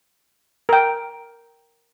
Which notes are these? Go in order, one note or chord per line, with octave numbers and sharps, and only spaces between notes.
A#4 G5